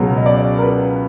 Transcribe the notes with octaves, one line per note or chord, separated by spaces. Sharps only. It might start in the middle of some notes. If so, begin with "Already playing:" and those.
Already playing: C#2 B2 F#3
D#5
D5
A#4
B4